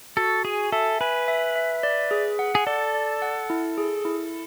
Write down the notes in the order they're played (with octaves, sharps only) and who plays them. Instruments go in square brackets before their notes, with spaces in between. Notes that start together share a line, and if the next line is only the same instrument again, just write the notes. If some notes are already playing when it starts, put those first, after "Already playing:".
[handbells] F#4 [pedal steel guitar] A4
[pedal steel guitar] G#4 [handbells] G#5
[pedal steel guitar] A4 [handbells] E5
[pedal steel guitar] B4 [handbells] G#5
[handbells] E5
E5
D5
G#4
F#5
[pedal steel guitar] G#4
[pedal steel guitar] A4 [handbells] D5
[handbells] D5
F#5
E4
G#4
E4